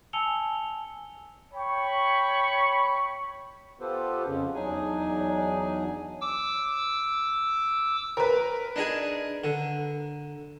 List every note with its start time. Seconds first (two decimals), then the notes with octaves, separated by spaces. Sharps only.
0.13 G#5 A5 E6 C#7 F7 G7
1.54 C#5 G5 B5 C#6
3.80 B3 F4 G4 A4 B4 C5
4.26 F2 C#3 C#4
4.54 E2 F#3 D4 D#4 G#4 G#5
6.21 D6 E6
8.17 A#4 B4
8.76 D4 D#4 G#4
9.44 D3